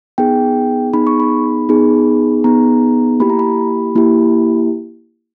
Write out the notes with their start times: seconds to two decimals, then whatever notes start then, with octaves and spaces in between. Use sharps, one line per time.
0.18 B3 D#4 G#4 G5
0.93 B3 D#4 G#4 B5
1.07 C#6
1.20 B5
1.69 B3 D#4 G#4
2.44 B3 D#4 G#4 A#5
3.20 A#3 E4 G4 B5
3.30 A#5
3.39 B5
3.96 A#3 E4 G4